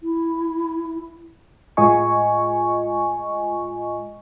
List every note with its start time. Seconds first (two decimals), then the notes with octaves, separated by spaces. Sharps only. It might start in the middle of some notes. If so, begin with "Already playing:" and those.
0.03 E4
1.77 A2 G#3 F4 D#5 G#5 C#6